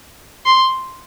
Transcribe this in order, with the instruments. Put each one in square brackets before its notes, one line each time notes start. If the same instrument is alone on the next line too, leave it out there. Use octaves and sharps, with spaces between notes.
[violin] C6